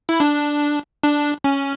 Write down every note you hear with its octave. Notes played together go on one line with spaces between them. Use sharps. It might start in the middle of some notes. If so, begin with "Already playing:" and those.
E4
D4
D4
C#4